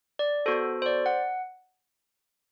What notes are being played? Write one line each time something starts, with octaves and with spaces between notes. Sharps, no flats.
D5
B3 F#4 A4 C5
C5
D5
F#5